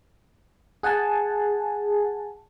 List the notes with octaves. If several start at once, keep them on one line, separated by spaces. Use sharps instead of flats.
G#4 F#5 G#5 A5